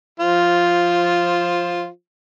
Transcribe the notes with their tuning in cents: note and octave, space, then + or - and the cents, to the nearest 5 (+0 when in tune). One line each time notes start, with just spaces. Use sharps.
F3 +0 F4 +0 C5 +15